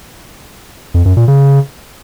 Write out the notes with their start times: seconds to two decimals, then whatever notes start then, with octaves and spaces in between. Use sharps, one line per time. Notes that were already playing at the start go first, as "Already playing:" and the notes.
0.94 F2
1.06 F#2
1.17 A#2
1.28 C#3